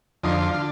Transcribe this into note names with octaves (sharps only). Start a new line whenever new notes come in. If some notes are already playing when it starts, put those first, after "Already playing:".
F2 D3 F3 D#4
D3 F4